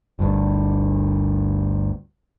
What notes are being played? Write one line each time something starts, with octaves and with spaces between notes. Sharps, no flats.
G1 D2 G2